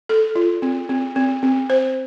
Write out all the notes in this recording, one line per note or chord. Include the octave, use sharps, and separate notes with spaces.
A4
F4
C4
C4
C4
C4
C5